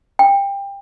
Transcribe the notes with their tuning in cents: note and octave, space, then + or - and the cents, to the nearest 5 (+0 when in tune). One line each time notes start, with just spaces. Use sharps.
G5 +20